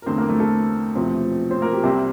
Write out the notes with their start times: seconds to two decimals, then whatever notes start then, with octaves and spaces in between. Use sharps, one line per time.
0.02 A#4
0.06 E2 D3 A3 C4 C5
0.18 A#3 A#4
0.29 A3 A4
0.40 A3 A4
0.95 E1 E2 C3 F3 C4
1.51 C4 C5
1.62 A#3 A#4
1.73 G4
1.84 C2 C3 G3 A#3 C4 C5